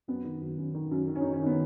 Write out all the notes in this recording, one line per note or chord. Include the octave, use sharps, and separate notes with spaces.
F#2 B3
D#3
F#2
F#2
D#3
F#2
D#3
C#4
D#3 D#4
C#4
D#3 B3